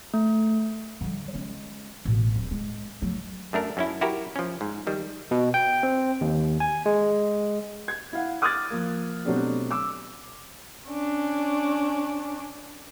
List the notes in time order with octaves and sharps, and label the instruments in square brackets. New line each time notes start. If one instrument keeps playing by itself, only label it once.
[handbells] A3
[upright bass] D3 G3
G#3 C#4
A1 B2
D1
G#3
F#3 A3
[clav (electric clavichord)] F#2 A3 D4 A#4
F#2 C#4 E4
E4 F#4 G4 A#4
F3 C#4
G#2
D#3 G3
[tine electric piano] B2
G5
C4
D#2
G#5
G#3
[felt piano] G#6
E4 F5 F#5
D6 D#6 F6 F#6 G#6 A6
F3 A#3
B2 F#3 A3 C4 D4 G4
D6 E6
[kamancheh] C#4 D4